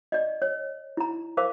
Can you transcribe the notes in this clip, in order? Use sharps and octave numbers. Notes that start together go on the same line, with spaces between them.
D5 D#5
C#5
E4 A#5
A#4 C5 F5 D6